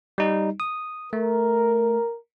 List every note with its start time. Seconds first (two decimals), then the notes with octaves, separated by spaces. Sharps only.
0.18 G3 D#4
0.60 D#6
1.13 A3 A#4